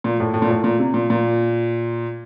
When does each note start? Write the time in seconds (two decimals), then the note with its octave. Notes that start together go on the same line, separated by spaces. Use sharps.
0.04 A#2
0.20 A2
0.34 A2
0.42 A#2
0.50 A2
0.64 A#2
0.79 C3
0.94 A#2
1.10 A#2